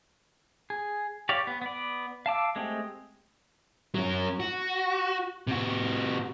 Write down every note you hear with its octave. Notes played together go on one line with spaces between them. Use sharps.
G#4
G4 C#5 D5 F5
B3
B3 D5
F5 A5 D6 E6
G#3 A3 C4 G4 G#4
F#3 C#4
F#4
C3 F#4